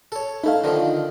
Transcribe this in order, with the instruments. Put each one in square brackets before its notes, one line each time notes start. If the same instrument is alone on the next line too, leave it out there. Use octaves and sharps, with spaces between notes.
[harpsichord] A4 C#5
[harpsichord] A3 E4 [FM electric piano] D#4 A4 F5
[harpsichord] D3 D#3 F3